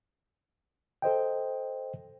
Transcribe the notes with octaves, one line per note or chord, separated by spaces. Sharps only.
A4 C5 D#5 G5